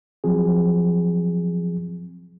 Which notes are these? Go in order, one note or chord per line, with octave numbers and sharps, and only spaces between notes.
F3 F#3 C4 G#4